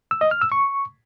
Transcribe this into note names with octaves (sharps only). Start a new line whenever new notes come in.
E6
D#5
F6
E6
C#6